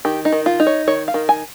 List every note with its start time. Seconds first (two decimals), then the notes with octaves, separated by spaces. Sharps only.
0.05 D#3 G4
0.25 D#4
0.32 D#3
0.46 F4
0.60 D#4
0.67 C#5
0.87 D#3 C#5
1.08 F5
1.14 D#3
1.29 G#5